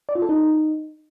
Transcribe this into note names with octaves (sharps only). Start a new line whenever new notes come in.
D5
F4
A4
D#4